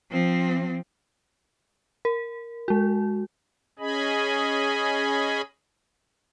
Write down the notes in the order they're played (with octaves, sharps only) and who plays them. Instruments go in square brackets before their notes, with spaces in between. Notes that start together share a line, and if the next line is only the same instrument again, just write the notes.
[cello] F3 C4
[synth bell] A#4
G#3 F#4
[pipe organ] C#4 G#4 D#5 G#5 B5